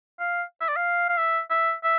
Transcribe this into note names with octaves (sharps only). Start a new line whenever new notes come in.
F5
E5
D5
F5
F5
E5
E5
E5